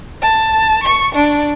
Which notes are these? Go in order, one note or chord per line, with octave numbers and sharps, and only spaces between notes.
A5
C#6
D4